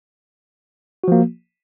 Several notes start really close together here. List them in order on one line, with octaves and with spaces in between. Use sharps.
F#4 F3 A#3